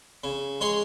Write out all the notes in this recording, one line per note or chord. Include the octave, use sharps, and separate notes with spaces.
C#3
G#3 C#5 C6